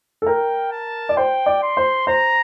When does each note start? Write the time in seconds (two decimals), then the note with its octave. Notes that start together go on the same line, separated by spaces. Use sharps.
0.22 A4
0.26 A#4 G5
0.71 A5
1.09 D5
1.16 C5 G5
1.46 D5
1.63 C6
1.77 C5
2.07 C5 A#5